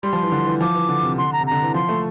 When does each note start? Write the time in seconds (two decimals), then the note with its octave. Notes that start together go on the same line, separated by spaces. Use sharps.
0.03 G3 C6
0.13 F3
0.23 E3
0.32 D3
0.46 E3
0.61 F3 D6
0.75 E3
0.89 D3
1.03 C3
1.18 D3 C6
1.33 A#5
1.40 C3
1.47 D3 A#5
1.62 E3
1.74 F3 C6
1.89 A3